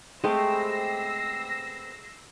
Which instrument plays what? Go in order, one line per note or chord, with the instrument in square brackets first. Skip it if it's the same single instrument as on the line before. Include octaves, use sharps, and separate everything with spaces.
[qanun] G#3 A3 [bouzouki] B3 C4 G4 [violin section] E6 A#6 C7